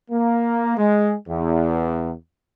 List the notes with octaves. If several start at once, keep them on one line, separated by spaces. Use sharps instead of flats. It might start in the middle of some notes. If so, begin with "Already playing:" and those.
A#3
G#3
E2